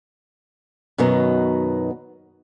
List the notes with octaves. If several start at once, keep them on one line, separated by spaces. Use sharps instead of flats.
F#2 B2 D#3 F#3 B3 D#4